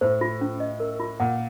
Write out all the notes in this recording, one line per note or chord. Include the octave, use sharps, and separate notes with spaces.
A2 C5
F4
C#4
D#5
A#4
F4
A#2 F#5